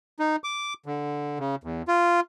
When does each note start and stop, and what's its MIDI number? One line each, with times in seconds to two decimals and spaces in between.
0.19 0.36 63
0.44 0.74 86
0.86 1.39 50
1.39 1.55 49
1.64 1.82 40
1.88 2.20 65